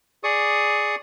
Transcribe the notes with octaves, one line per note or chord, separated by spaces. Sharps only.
G#4 D5 C#6 D#6